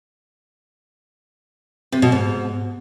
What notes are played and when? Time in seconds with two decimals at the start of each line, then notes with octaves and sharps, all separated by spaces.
1.92 C3
2.02 B2
2.12 G#2